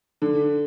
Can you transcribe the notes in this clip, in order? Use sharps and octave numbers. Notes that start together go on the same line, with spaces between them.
D3